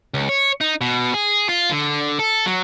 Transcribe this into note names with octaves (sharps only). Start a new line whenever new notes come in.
C#2
C#5
D#4
B2
G#4
F4
D3
A4
F#3